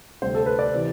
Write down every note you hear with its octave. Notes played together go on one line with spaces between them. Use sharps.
D2 C3 G3 C4 C5
A4
B4
D5
C3 E3